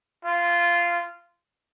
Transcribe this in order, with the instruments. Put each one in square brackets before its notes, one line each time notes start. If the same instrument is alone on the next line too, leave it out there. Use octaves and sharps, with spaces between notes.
[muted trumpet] F4